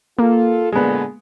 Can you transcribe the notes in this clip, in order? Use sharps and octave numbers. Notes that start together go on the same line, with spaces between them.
A#3 F4 A4
A#2 D3 G#3 B3